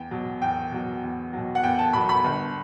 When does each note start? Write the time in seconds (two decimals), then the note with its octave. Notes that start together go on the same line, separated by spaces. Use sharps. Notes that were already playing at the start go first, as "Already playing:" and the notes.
Already playing: E2 G5
0.11 B2 F#3
0.42 E2 G5
0.72 B2 F#3
1.03 E2
1.33 B2 F#3
1.55 F#5
1.63 E2 G5
1.79 A5
1.93 B2 F#3 B5
2.09 B5
2.24 G1